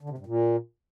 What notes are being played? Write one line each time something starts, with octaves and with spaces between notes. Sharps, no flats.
D3
C3
G2
A#2